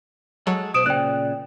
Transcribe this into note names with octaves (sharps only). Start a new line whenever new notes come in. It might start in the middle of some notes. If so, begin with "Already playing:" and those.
F#3 G#3 A4
B1 C5 D#6 D7 E7
A#2 C#3 D5 G5 F#6